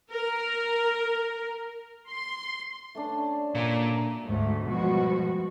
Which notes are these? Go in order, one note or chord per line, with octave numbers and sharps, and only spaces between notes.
A#4
C6
A3 C#4 D4
A#2 A#3
D2 G#2 A3
B2 F3 G3 G#3 F#4